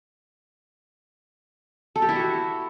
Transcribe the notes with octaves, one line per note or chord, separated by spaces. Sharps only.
A4
G4
E4
F#4